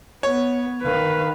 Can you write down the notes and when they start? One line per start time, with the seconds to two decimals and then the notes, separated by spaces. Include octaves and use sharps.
0.23 B3 C#5
0.83 D#3 B4 F5